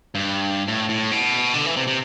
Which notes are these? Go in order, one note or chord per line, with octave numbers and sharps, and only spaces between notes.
G2
A2
A2
B2
D3
E3
C3
C3